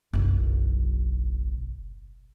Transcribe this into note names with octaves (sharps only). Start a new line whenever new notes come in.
F#1 B1